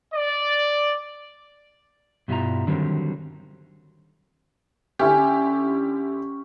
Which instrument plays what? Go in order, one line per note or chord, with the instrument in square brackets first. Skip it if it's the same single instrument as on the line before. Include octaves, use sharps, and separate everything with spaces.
[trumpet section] D5
[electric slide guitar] G2 B2 G3 E4 F4 A#5
D3 D#3 F#3 G3 C4
[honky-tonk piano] D3 E4 G4 [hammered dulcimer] C#4